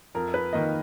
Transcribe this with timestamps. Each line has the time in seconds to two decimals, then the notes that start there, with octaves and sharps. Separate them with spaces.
0.15 F2 A#4
0.34 B4
0.53 D#3 A#3 D#5